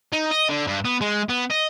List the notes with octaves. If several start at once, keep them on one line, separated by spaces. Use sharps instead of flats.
D#4
D#5
D3
G2
B3
G#3
B3
D#5